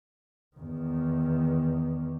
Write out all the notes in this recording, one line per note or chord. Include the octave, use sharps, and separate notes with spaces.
E2 D#3